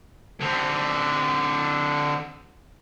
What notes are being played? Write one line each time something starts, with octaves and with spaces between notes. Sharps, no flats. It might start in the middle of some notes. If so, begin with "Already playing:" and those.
D3 C4